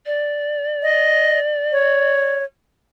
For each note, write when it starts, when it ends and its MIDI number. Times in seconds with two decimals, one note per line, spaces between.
0.06 2.37 74
0.82 1.39 75
1.72 2.44 73